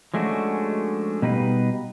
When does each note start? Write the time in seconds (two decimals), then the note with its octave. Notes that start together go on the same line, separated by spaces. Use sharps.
0.14 F3 G#3 A3 C#4 D4 F#4
1.22 B2 G3 D#4 B4 F5